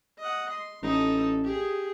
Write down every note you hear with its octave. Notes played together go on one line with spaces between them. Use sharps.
D#5 F#5
C6
A1 D#4 A4
G4 G#4